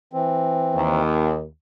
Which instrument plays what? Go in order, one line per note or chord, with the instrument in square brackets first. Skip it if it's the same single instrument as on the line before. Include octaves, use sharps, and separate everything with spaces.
[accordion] E3 C4
[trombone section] D#2